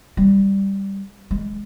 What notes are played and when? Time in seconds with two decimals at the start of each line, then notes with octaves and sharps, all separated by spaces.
0.17 G3
1.31 G#3